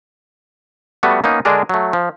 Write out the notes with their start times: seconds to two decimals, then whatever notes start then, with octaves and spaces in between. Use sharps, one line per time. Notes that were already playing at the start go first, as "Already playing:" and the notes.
1.03 G3 A3 B3 F#4
1.24 A#3 B3 C#4 D#4
1.45 D3 G#3 D4 G#4 A#4
1.69 F#3 A3
1.93 F3